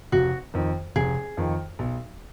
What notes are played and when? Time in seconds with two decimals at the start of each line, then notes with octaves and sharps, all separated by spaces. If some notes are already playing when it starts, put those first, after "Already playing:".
0.12 F1 F#4
0.54 F2 D#3
0.96 F1 G#4
1.37 F2 D#3
1.79 B1